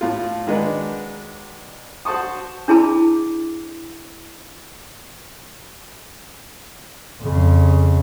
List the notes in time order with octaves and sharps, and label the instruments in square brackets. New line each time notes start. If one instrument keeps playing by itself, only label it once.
[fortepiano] A2 F4
D#3 F#3 G#3 D4 D#4 B4
F#4 C5 A5 C#6 D#6
[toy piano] D4 E4 G#4 A5 B5
[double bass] F2 C#3